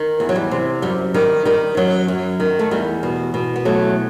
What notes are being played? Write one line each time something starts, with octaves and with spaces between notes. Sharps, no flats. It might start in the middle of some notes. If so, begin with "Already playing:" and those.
Already playing: D#3
E2
F#3
G3
C3
F#2 G3
D#3 G3
D#3 G3
F#2 F#3
F#2
D#3
A3
E2 G3
B2
B2
B3
E2 F#3 A3